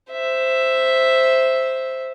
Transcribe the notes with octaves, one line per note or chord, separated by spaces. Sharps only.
C5 E5